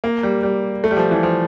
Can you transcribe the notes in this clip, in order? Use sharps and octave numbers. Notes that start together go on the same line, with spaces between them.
A#3
G3
G3
A3
G3
F3
E3
F3